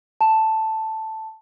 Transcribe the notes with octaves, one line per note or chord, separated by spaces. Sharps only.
A5